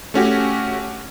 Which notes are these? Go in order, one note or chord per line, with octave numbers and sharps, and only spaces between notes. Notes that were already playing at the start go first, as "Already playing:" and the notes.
A3 C#4 F#4 G4